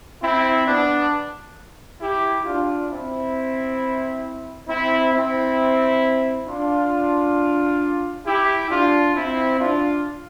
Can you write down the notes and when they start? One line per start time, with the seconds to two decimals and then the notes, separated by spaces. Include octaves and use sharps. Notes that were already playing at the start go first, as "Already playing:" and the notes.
0.22 C4 E4
0.67 B3 D4
2.01 E4 G4
2.45 D4 F4
2.90 C4 E4
4.68 C4 E4
5.13 C4 E4
6.47 D4 F4
8.26 E4 G4
8.71 D4 F4
9.15 C4 E4
9.59 D4 F4